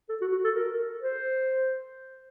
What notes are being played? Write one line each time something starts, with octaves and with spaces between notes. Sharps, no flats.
A4
F#4
F#4
A4
A#4
C5